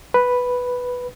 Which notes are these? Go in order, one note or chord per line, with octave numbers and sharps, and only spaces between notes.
B4